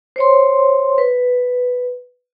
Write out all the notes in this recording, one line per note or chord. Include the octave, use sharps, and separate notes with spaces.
C5 C#5 C6
B4